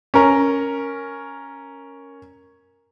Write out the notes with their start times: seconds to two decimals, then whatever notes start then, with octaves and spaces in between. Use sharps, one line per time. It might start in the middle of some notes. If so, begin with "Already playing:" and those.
0.14 C#4 A#4